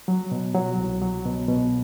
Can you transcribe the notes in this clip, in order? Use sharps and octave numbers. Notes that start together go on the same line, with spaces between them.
F#3
B2
F#3
C2
F#3
B2
B2